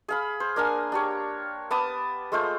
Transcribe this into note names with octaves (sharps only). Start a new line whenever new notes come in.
G#4 F5 B5
C5
A#3 D4 A#4 G#5
D4 G4 C#5
B3 A5 D6 D#6
G#3 A3 F4 C5